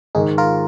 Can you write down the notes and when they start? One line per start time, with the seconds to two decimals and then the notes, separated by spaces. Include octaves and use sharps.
0.15 G#2 D#3 G#3 D#4 G#4
0.38 F4 A#4